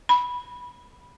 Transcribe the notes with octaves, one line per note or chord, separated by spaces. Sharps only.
B5